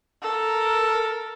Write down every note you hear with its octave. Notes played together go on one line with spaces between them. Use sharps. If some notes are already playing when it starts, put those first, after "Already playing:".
A4 A#4